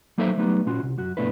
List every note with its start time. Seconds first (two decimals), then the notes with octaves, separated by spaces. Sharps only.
0.18 F#3 A#3 D#4 A4 C5 E5
0.37 F#3 G3 A3 B3 D#4
0.66 A#2 C#4 F4 F#4
0.83 C2
0.98 F#2 F#4
1.17 G2 B2 A3 D4 E4 B4